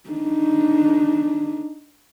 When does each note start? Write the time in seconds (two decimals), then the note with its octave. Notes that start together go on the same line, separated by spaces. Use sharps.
0.10 D4 D#4